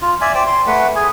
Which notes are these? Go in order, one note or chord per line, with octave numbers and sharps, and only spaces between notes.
F4
D5 E5 G#5
C5 D5 G5
C6
A3 B4 F#5
G#4 G#5